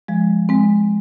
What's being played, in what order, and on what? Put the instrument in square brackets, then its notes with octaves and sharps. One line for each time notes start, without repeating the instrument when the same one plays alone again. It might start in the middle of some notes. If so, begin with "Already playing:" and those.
[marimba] F3 G#3
G#3 C4